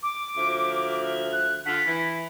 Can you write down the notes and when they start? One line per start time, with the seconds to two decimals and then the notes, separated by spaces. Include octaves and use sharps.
0.03 D6
0.36 D2 F3 E5
1.33 F#6
1.66 D3 F4 F#5 B6
1.87 E3